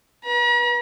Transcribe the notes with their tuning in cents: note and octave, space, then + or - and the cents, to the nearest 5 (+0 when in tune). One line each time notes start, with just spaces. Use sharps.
B4 -25 A#5 +45